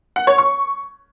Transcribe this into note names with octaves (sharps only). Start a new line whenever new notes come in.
F#5
C#5
C#6